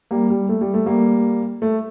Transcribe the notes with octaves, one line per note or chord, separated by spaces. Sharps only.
G3 A#3
G3
A3
G3
A3
G3 A#3
A3